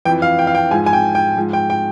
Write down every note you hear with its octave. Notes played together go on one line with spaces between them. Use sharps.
F2 E3 G5
F5
G5
F5
G5
G#2 F3 G#5
G#5
G5
G5
G#2 F3
G5
G5